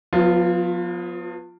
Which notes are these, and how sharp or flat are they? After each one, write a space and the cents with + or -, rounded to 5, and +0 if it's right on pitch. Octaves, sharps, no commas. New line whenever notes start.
F3 +45 B3 +0 F4 -5